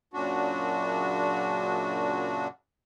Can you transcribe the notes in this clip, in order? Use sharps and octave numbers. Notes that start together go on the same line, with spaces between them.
F#2 A#2 C#3 D4 F#4